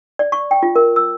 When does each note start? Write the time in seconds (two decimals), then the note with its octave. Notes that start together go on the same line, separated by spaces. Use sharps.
0.19 D5
0.32 C#6
0.51 G5
0.63 F4
0.76 A#4
0.96 E6